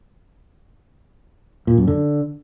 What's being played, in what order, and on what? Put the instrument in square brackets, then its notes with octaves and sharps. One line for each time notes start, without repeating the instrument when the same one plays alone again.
[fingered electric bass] A#2
F#2
D3